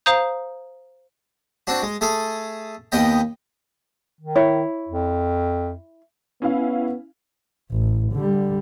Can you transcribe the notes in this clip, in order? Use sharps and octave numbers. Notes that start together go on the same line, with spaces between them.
C5 F5 A#5 D#6 G6
C4 D4 F#4
G#3
A3 G#4 A4
D#2 B3 D#5 G5
D#3
E4 C#5
F2
B3 C#4 E4 F5
A1
D3 G3